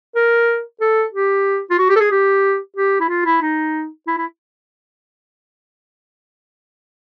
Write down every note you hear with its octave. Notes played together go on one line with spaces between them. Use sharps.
A#4
A4
G4
F4
F#4
G4
A4
G#4
G4
G4
E4
F4
E4
D#4
E4
E4